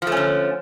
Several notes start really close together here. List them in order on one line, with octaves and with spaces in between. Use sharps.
F3 A3 C#4 D3